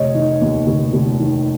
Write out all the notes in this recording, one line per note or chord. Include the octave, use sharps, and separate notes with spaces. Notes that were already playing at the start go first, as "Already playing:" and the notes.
Already playing: F1 C#5 D#5
D#3
D#2
F1
F1
D#3